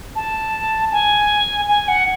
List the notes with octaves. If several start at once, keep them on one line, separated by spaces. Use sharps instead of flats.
A5
G#5
G#5
F#5